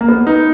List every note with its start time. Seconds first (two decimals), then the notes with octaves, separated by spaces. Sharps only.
0.01 A#3
0.08 B3
0.27 D#4